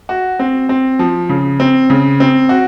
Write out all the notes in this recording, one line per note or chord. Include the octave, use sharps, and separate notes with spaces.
F#4
C4
C4
F3
C#3
C4
C#3
C4
F#4